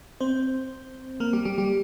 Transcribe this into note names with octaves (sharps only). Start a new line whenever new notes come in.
C4 C5
A#3 A#4
G3 G4
G3 G4
G3 G4